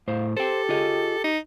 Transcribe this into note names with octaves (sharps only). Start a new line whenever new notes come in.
A2 C5 F5
G4 A4 C5 G5
F4 G#4 D#5
D#4